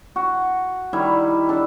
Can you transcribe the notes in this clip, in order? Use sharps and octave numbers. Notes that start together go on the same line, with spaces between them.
F#4
D#3 G3 E4
D4 A4